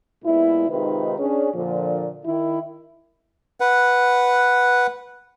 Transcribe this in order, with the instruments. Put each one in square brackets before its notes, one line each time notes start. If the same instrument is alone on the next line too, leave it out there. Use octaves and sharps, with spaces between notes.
[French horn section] A#2 G#3 B3 E4
C3 D#3 G#3 D#4 F4 B4
C#4 D4 G#4
A#2 D3 F3
D#3 E4
[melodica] B4 F#5